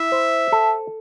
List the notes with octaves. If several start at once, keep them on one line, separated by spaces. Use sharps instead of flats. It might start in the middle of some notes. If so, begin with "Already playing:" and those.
Already playing: E4 E5
C5
A4